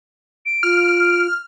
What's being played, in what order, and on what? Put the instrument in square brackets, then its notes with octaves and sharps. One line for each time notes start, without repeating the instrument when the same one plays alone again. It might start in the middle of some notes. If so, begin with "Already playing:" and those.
[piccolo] D7
[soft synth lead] F4 [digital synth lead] F6